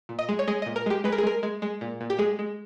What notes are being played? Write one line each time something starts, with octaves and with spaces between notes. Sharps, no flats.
A#2
D#5
G#3
C#5
G#3 D#5
A#2 D#5
A#4
G#3 G4
G#3 B4
A#4
G#4
G#3 A#4
G#3
G#3
A#2
A#2
G4
G#3 G#4
G#3